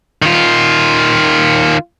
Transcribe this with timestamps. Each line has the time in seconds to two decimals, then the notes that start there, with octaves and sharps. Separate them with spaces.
0.22 D#3 F4